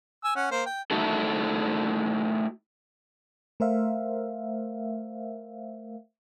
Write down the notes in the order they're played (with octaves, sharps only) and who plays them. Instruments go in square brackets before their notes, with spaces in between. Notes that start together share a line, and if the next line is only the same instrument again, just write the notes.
[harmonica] G#5 E6
C#4 F#5
A#3 C5
G5
[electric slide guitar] A3 D#4 E4 F#4 A4
[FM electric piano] A3 A#4 C5 E5 F5